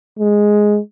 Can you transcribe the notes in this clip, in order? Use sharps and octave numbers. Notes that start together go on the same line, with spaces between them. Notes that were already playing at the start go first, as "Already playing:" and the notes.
G#3